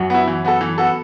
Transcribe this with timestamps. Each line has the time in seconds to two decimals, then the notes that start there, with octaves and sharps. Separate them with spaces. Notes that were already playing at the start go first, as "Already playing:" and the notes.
Already playing: F#2 F#3
0.10 B3 E4
0.27 E3
0.45 B3 F#4 A4
0.61 E3
0.78 B3 F#4 A4